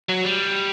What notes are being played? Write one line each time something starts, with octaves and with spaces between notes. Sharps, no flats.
F#3
G3